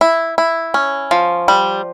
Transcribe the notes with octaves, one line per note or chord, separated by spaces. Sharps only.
E4
E4
C#4
F3
G3